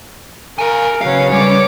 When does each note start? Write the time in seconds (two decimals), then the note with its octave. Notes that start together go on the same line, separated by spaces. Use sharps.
0.59 A#4 F5 G#5
1.01 C#3 F#3 B3 C#4 F5
1.32 G3 C#5 D6